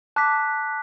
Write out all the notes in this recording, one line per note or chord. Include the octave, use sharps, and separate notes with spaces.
A5 D6 F#6 B6